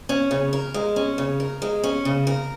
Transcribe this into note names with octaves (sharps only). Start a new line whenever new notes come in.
C#4
C#3
A#4
G#3
C#4
C#3
A#4
G#3
C#4
C#3
A#4